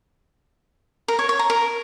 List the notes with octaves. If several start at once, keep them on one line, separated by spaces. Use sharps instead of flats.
A#4
C#5
C#5
A#5
A#4